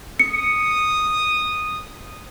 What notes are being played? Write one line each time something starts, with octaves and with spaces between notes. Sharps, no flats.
D#6 C#7